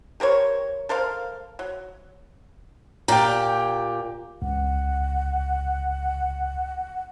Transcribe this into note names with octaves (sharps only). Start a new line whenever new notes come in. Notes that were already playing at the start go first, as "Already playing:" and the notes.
G4 A#4 C5 C#5
A4 A#4 C5 F5
F#3
A#2 G4 G5 A#5
C#2 F#5